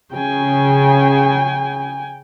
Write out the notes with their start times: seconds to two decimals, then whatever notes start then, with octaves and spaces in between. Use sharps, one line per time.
0.13 C#3 G5 G#5